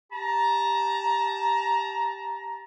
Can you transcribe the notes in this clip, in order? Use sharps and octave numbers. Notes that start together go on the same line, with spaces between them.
G4 A5 A#5